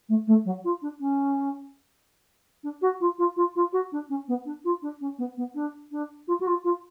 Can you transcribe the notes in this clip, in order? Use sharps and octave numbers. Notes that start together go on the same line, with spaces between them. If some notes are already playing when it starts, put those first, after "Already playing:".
A3
A3
F#3
F4
D4
C#4
D4
F#4
F4
F4
F4
F4
F#4
D4
C#4
B3
D4
F4
D4
C#4
B3
B3
D4
D4
F4
F#4
F4
F4